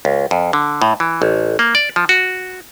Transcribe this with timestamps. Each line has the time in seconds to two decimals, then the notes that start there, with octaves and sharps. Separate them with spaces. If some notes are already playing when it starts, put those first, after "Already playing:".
0.05 C#2
0.31 F2
0.53 D3
0.82 A2
1.00 E3
1.22 A1
1.59 A#3
1.75 D5
1.96 F3
2.09 F#4